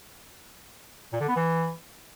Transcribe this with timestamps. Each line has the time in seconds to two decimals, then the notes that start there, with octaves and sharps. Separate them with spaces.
1.13 A#2
1.21 D3
1.28 B3
1.36 E3